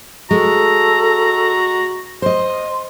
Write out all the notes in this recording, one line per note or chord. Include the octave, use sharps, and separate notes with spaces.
G#3 F#4 A4 A#5
C5 D#5 C6